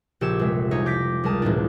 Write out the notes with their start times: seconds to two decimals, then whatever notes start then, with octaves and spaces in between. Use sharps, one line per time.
0.21 A#1 C#3 G4 C#5 E6 E7
0.39 F1 G#3 E5
0.71 C2 D#4 C#5 D#6
0.86 D6 G6 A#6 B6 D7
1.24 C#2 G3 A#4 A5 D#6
1.42 E1 C#2 A2 D4